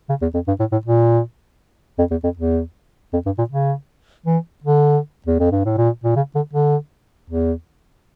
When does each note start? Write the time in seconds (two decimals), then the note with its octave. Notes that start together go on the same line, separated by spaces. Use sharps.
0.09 C#3
0.22 E2
0.34 F2
0.48 G2
0.60 A2
0.72 A2
0.86 A#2
1.99 F2
2.11 E2
2.24 F2
2.37 E2
3.13 F2
3.26 G2
3.38 A#2
3.50 C#3
4.26 E3
4.64 D3
5.26 E2
5.40 F2
5.52 G2
5.65 A2
5.78 A#2
6.04 A#2
6.16 C#3
6.35 D3
6.53 D3
7.30 E2